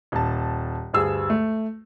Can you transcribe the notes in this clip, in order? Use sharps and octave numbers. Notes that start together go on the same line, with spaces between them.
D#1 A5
D2 G2 G#4 E6
A3